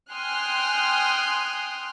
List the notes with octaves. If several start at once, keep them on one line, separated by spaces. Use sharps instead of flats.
G5 G#5 C6 D#6 F6 F#6